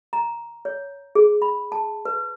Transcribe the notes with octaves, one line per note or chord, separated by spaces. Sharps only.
A#5
C#5
G#4
B5
A5
B4